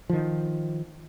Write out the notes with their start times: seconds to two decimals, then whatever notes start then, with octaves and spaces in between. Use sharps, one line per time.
0.10 D#3 F3